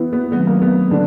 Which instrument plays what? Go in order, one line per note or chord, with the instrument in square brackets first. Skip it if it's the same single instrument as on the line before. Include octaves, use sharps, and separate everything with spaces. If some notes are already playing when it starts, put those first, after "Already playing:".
Already playing: [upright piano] E3 B3 E4
B3
[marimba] D#3 F#3 A3 C4 D#4 [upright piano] B3
[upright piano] A#3
B3
D3 D4